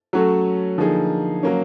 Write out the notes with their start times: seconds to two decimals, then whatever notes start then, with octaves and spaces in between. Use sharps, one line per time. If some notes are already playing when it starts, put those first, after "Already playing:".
0.13 F#3 A3 C#4 F#4 A4
0.78 D3 F3 A#3 D#4 G#4
1.43 F#3 A#3 C#4